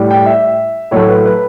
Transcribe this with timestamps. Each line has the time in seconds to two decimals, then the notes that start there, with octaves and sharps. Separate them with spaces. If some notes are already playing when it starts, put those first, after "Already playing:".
Already playing: A2 G3
0.11 G5
0.26 E5
0.91 A2 F#3 A3 C#5
1.09 B4
1.25 B4